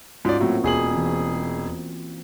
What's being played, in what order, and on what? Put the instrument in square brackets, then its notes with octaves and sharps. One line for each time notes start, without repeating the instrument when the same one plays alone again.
[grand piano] G#2 D5 [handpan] C#4 F4 F#4
[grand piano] A2 F#3 [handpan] A#3 C4 F#4
[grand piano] E1 G#4 F#7
[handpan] E3 C4